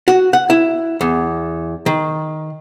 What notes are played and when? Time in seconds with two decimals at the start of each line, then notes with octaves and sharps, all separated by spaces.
0.08 F#4
0.33 F#5
0.50 E4
1.01 E2
1.86 D#3